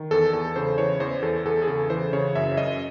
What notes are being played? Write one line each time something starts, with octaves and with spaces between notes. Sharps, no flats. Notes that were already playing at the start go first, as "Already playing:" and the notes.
Already playing: D#3
E2 A4
E2 A4
C#3 C5
E3 C#5
E2 C5
E2 A4
E2 A4
G#4
C#3 A4
E3 C5
C#3 C#5
F#2 E5
F#2 D#5